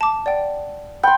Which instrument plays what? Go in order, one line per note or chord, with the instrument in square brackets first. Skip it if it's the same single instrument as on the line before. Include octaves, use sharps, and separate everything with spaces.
[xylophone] A5 D6
D5 F#5 G5
[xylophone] F#5 B5 [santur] G5 C6